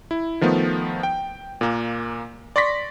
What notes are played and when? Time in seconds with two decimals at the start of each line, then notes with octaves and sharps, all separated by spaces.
0.11 E4
0.41 D#3 F3 A3 B3
1.03 G5
1.61 A#2 A#3
2.56 D5 C6 C#6 A#6 B6